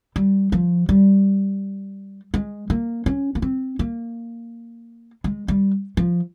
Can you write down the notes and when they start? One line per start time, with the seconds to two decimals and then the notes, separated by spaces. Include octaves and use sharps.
0.16 G3
0.52 F3
0.89 G3
2.34 G#3
2.70 A#3
3.06 C#4
3.35 A#3
3.42 C4
3.79 A#3
5.24 G#3
5.48 G3
5.97 F3